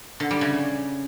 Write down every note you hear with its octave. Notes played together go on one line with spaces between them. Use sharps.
D3
G3
C#3